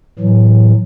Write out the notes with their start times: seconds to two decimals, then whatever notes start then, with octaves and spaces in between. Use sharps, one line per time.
0.19 A2 E3 F#3